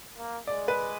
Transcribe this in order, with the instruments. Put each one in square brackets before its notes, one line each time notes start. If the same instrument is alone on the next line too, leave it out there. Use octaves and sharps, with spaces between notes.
[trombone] A#3
[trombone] G#3 [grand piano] D5
[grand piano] B4